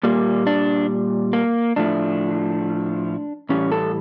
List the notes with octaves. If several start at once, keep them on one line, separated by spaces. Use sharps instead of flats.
A#2 G3 A#3
D4
A#3
A2 F3 A3 D4
A2 E3 G3 C#4
A4